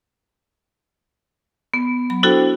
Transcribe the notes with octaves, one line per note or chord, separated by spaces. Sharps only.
B3
F#3 B5
D4 E4 F#4 A4 C5 G5